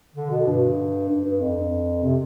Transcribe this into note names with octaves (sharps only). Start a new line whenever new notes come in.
D3
B2
G2
G2
G2
F2
C3